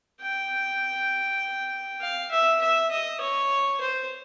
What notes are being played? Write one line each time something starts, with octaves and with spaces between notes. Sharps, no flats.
G5
F5
E5
E5
D#5
C#5
C5